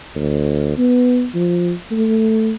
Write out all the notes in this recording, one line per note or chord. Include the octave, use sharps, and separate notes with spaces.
D2
B3
F3
A3